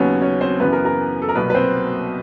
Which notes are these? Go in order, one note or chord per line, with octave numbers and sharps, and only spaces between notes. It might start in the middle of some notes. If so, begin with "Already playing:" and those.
Already playing: D#2 C#3 F#3 B3 C#4 C#5
C#4 C#5
C4 C5
F#2 C#3 E3 B3 B4
A#4
A#4
A4
A#4
C2 B2 F#3 A#3 B3 B4
B4
C4 C5